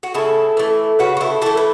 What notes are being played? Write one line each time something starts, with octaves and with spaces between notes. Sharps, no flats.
F#4
C#3 E4 A4
E3 A3
C#3 F#4 B4
F#4
E4 A4
E3 A3 E4 A4
B4